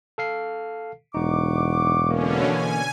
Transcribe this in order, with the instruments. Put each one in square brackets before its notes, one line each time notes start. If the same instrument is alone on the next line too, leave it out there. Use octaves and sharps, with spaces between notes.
[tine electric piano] A4 F5 C7
[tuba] E1 [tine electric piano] D#4 [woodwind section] F#5 C#6 D6
[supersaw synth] B2 D3 C#4 [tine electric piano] A#3
[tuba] E3 [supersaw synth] G#5